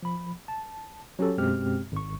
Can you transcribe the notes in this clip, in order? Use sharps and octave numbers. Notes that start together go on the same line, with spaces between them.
F3 B5
A5
F#3 C#4 G4 A4
F#2 B2 G#3 C4 G4 F6
G#1 C#6